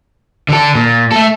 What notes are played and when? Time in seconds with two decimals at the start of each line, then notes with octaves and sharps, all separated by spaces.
0.49 D3 A4
0.75 A#2
1.12 A3 A4